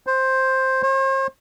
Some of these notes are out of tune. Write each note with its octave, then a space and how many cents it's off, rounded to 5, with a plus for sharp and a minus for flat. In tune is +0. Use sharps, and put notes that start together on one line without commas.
C5 +5
C5 +45